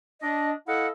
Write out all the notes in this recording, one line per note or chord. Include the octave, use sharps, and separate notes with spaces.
D4 D#5
E4 A4 D#5 F5 F#5